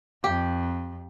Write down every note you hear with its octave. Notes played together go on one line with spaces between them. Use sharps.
F2 G4